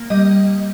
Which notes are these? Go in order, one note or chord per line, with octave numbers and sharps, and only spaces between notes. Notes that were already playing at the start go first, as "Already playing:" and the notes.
Already playing: A#3
G3 D#5